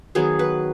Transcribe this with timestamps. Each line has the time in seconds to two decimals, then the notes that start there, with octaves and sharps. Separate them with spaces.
0.15 D#3 F#3 B3 G#4
0.39 B4